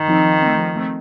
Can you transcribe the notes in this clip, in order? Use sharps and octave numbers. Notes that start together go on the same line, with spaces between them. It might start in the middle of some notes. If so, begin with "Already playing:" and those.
Already playing: D#3
F3 C4 D#4
F3
A3 C4
F3
A3 C4